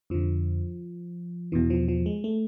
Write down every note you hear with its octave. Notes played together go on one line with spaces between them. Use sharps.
F2 D3 F3
E2 B2 E3
F3
F3
G#3
A3